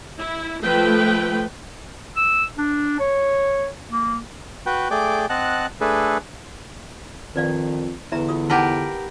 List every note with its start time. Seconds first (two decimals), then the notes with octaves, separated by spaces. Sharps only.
0.18 E4
0.62 F3 A3 B4 G5
2.17 E6
2.58 D4
3.00 C#5
3.90 A#3
4.66 F#4 B4 G5
4.91 A3 G#4 D5 G5 D6
5.30 C4 D#5 F#5 A5 F#6
5.81 A3 D4 G#4 A4 B4
7.36 F2 D#3 B4 D5 F5
8.12 E2 D3 B4 E5 A#5
8.29 F4 D#6
8.50 D#4 G4 A#4 B4 F#5 A5